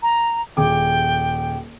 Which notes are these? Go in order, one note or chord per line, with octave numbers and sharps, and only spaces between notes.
A#5
D#1 G#4 G5 D6